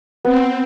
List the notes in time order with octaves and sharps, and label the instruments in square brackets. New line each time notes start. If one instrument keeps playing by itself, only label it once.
[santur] B3 [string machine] C4